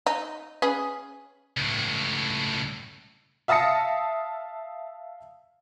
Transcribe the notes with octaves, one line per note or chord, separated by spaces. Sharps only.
D#4
C#4 G#4 B4
C#2 A2
E5 F5 A5 D#6 A#6 C#7